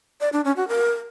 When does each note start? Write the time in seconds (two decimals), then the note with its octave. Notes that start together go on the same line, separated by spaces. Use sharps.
0.21 D5
0.33 D4
0.45 C#4
0.57 F#4
0.69 A#4